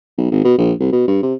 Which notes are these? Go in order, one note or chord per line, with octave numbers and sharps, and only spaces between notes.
B1
G#1
B2
A#1
C2
B2
G2
C3